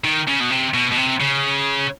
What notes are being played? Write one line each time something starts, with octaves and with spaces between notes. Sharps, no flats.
D#3
C#3
B2
C3
B2
B2
C3
C#3